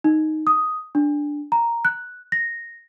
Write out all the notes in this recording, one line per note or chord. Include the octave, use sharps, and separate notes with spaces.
D#4
D#6
D4
A#5
F#6
A#6